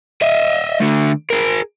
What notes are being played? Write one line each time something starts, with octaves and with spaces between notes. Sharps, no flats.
D#5 E5
D3 A3
G#4 A#4